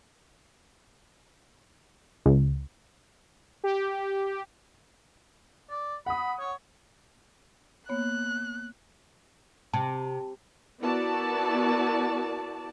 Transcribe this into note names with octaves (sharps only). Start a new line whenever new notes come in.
C#2
G4
D5
F#5 B5 D#6
C#5
A#3 B3 C#5 F#6
C3 A5
B3 E4 F#4 A#4 D5 A5